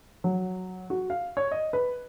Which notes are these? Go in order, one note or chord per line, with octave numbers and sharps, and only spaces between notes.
F#3
F#4
F5
C#5
D#5
B4